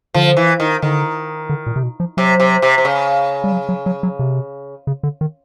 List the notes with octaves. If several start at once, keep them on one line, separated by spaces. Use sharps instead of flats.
D3 F3
E3
D#3
D3 D#3
D3
A#2
C3
B2
F3
C3 F#3
C3
C3
C3
C#3
G3
F#3
F#3
F#3
F#3
C3
C#3
D3
D#3